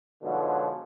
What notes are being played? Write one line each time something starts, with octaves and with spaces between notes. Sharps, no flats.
G#2 B2 D3 F3 F#3